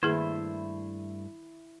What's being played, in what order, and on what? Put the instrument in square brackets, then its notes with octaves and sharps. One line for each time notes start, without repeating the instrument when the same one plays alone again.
[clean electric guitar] G2 A3 C5 [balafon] D#3 A#3 G#4 [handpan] E4